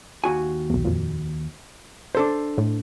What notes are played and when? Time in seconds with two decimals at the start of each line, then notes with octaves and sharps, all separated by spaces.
0.24 D#2 F#4 G#5
0.70 B1 E2
0.85 F2 A#2
2.15 D4 A4 C5
2.58 A2